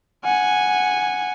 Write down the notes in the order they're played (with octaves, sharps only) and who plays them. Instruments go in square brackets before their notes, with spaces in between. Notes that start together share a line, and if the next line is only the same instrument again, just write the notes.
[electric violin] F#5 G#5